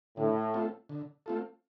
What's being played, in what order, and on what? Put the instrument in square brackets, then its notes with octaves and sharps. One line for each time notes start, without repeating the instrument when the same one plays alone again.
[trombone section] A2 [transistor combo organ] D3
[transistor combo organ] A3 C4 F4 A4
D3
A3 C4 F4 A4